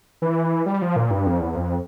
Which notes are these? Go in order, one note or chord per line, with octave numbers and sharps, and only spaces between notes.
E3
G3
F3
A#2
G2
F2
E2
F2